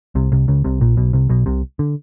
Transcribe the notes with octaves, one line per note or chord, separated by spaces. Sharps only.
C2 C3
C2 C3
C#2 C#3
C2 C3
A#1 A#2
B1 B2
C2 C3
B1 B2
C2 C3
D3